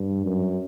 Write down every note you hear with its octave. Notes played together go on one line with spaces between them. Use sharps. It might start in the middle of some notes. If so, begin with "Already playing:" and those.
Already playing: G2
F#2